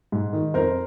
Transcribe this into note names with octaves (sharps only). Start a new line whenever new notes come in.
G#2
D#3
F2 A#4 C5